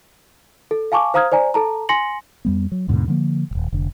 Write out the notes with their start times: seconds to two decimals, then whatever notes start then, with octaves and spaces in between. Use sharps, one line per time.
0.71 A4
0.92 F5 G#5 A5 C#6 D6
1.14 C5 F5 A#5 D#6 F6 G#6
1.32 C5 D5 G#5 A#5
1.54 A4 A5 A#5
1.89 G#5 C6 A#6 C#7 F#7
2.45 F2 G3 B3
2.72 F#3
2.88 D#2 G#2 B2 D3
3.08 D3 F3 A3 A#3
3.51 D#1 G#1
3.73 F1 D3